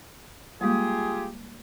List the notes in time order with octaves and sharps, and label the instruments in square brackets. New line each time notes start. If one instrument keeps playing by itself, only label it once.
[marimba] G3 G#3 A#3 [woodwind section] F4 G4 G#4